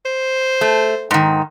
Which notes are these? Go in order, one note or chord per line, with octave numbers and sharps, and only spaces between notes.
C5
A3
G#2 D#3